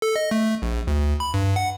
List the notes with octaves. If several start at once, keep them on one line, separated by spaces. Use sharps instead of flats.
A4
D#5
A3
A#1
D2
B5
G2
F#5